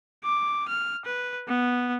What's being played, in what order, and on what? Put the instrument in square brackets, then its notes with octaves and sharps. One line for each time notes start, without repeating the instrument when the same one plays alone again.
[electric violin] D6
F6
B4
B3